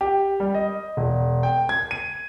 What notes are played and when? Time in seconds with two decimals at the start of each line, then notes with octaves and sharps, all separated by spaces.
0.01 G4
0.40 G3
0.54 D#5
0.97 E1
1.43 G5
1.69 G#6
1.91 D#7